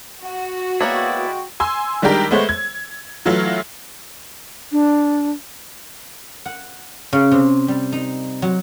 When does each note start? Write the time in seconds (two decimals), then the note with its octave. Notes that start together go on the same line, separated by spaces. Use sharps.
0.22 F#4
0.81 G#3 A#3 B3 E4 C#5 D5 G5 C#6
1.60 G#5 C6 E6
2.02 D#3 G3 G#3 D4 G4 A#4
2.31 G#3 A3 B3 C5 C#5
2.49 G#6
3.26 E3 F#3 A3 E4 F4
4.72 D4
6.46 F#5
7.13 C#3
7.32 C3
7.68 G3
7.92 D#4
8.42 F#3